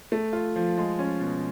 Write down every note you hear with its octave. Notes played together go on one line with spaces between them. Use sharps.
A3
F4
F3
G#3
C#4
B2